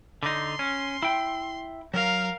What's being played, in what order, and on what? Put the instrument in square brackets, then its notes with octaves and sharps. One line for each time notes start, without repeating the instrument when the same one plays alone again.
[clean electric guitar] D3 D#4 [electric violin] C6
[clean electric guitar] C#4
E4 G5
[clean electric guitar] F#3 [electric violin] A#4 F5